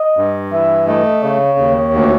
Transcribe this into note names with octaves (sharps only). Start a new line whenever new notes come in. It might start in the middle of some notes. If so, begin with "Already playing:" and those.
Already playing: D#5
G2
E3 E5
A3 D#5
C#3 C#5
D#2
D2